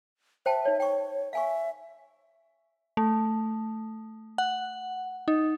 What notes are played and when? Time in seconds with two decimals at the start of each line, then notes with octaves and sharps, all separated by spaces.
0.46 C5 E5 G5 A5
0.65 D#4 C#5
0.80 C#5 G5 C#6
1.33 E5 F5 G#5 C#6
2.97 A3
4.38 F#5
5.28 D#4